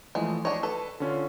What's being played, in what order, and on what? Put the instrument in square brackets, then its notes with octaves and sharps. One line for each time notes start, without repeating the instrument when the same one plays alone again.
[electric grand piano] E3 F3 A3 [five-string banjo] G#3
[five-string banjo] D4 C#5 [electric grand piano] D#5 A5
[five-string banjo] A4 [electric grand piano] B4
[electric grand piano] D3 C#4 F4